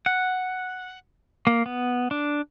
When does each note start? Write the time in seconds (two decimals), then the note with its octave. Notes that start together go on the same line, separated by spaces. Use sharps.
0.06 F#5
1.47 A#3
1.66 B3
2.11 D4